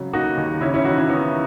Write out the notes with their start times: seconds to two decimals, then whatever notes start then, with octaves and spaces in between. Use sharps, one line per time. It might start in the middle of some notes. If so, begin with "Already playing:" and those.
Already playing: G#1 C#3 F#3
0.13 A#3 D#4 F#4
0.37 D#2
0.61 C#3 C#4 E4
0.74 C#4 E4
0.85 E3 D#4 F#4
0.98 C#4 E4
1.09 B3 D#4